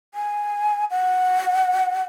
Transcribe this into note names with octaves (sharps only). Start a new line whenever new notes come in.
G#5
F#5